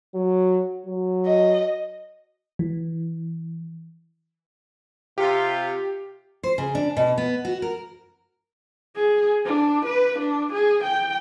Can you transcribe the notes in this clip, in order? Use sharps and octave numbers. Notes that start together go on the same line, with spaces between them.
F#3
F#3
D#5
E3
C3 F4 G4
C5
C#3
D4
B2
B3
F#4
A#4
G#4
D4
B4
D4
G#4
G5